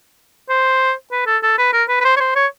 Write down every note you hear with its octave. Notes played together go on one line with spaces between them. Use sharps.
C5
B4
A4
A4
B4
A#4
B4
B4
C5
C#5
C5
C#5